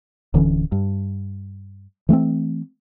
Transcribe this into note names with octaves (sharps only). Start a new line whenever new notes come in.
D1 D3 E3 C#4
G2
E3 A3 B3 C4